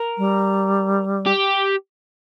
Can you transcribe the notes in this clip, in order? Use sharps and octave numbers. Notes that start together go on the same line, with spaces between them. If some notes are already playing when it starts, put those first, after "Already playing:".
Already playing: A#4
G3
G4